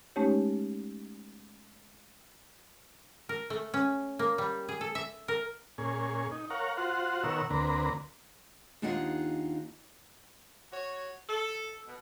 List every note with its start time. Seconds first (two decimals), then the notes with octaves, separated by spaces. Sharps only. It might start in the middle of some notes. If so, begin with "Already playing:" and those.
0.16 G#3 A3 C#4 D#4 G4 C#5
3.29 A#4
3.50 A3
3.74 C#4
4.19 A#3
4.38 G3
4.69 G#4
4.81 A4
4.95 E5
5.28 A#4
5.78 A#2 C#4 G#4
6.32 D#4
6.50 A#4 C#5 F5 F#5
6.77 F4 F#4 C5 F#5
7.23 B2 D#3 A#4 C#5 F#5 E6
7.50 D2 D3 A#3 C4 B4 A#5
8.82 D#2 D4 D#4 F4 D#5 F#5
10.72 F#4 C#5
11.29 A4
11.87 B2